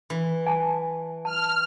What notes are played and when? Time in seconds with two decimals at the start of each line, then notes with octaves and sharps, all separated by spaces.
0.10 E3
0.46 G#5 A5
1.25 A5 F6